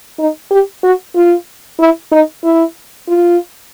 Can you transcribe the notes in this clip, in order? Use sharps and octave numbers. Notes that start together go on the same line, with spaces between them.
D#4
G4
F#4
F4
E4
D#4
E4
F4